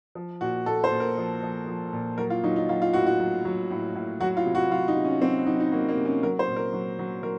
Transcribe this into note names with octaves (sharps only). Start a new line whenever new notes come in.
F3
A#2 F#4
A#2 A4
C5
A#2
A#4
F3
F3
F3
A#2
F#3 A#4
F4
F#3 D#4
D#4
F#3 F4
F4
A2 F#4
F#4
F#3
F#3
A2
A2
F#3 F#4
F4
C3
F#4
F#3 F4
D#4
C3
C#4
F#3 C4
F#3 D#4
D#4
F#3 A#3
A#3
C3
C#4
F#3 A#4
C5
A#2
A#4
F#3
F#3
F#3 A#4